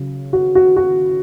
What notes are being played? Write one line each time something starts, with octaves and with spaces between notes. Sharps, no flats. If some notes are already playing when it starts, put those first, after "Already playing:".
Already playing: C#3 F#3
F#4
F#4
F#4